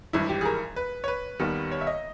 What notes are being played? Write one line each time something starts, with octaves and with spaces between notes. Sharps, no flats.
G#1 G2 E3 E4
G4
G#4
A#4
B4
C#5
B4
D#2 D#3 G3 B3
C#5
E5
D#5